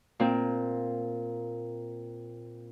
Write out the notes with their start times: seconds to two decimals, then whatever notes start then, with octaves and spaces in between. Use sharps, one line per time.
0.20 A#2 C4